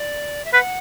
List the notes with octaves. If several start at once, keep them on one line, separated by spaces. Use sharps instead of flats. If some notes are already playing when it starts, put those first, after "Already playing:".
Already playing: D5
E5
B4 F#5